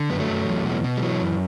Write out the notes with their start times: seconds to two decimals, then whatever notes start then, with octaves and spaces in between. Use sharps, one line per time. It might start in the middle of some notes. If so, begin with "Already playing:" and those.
Already playing: D3
0.10 F#2 B3
0.19 F#3 A3
0.29 F#2
0.47 E2
0.65 B2
0.83 B2
0.97 G3
1.02 E3 F#3
1.21 F#2